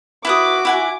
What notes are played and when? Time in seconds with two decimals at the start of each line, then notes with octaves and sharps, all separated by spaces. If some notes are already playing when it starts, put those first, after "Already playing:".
0.25 E4 F#4 B4 D6 D#6
0.65 E4 F#5 G#5